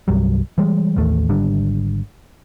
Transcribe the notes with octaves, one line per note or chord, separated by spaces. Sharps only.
C2 G2 F#3 G3
E3 G3 G#3
A1 D#2 A3
G#1 D3 G3 D4